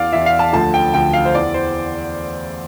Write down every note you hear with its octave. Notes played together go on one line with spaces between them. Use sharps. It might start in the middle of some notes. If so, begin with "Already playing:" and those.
Already playing: E2 E3 D5 F5
E2 E3 E5
F5
A5
D2 D3 F3 A5
G5
D2 D3 F3 G5
F5
C5
E2 E3 D5
C5